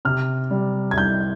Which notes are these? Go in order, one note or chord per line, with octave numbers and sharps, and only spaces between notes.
C3 F6
G3
G#6
C2 G6